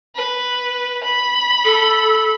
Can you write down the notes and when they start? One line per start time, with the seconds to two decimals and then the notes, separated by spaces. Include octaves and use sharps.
0.15 B4
1.04 B5
1.64 A4